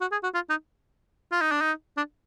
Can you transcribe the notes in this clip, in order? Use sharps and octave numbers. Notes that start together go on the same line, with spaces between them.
F#4
G#4
F#4
F4
D#4
F4
D#4
D4
D#4
D4